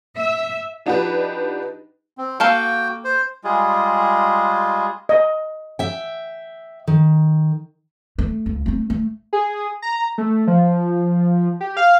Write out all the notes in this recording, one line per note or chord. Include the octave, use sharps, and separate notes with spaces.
E5
F3 D4 D#4 F#4 G4 B4
C4
A#3 F#4 A4 F5 G5
C5
G3 G#3 F4 G#4
D#5
E5 G5
D#3
A3
C#2
A3 C4
A3
G#4
A#5
A3
F3
G4
F5